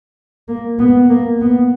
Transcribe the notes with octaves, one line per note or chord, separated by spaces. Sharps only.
A#3
B3
A#3
B3